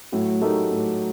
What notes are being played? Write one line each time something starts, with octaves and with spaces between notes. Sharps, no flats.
A2 F#3
A3 D#4 G4 A#4
A2